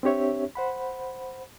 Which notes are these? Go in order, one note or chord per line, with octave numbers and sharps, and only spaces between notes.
C4 D4 G4 C#5 E5
C5 F#5 B5